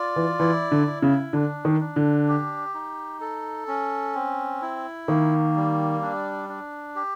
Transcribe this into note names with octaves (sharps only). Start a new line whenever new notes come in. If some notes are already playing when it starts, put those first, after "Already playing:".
Already playing: F4 D5
E3
E3 E4
D3
E4
C#3
D3 D4
D#3
D4
D3
G4
D#4
A4
C#4
C4
E4
D#3 A#3
G3
D4
D4
G4